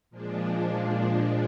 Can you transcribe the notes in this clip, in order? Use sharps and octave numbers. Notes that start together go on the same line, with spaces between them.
A#2 F3 G#3 D4